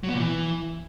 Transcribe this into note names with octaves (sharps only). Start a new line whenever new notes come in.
F#3
B3
A#2
E3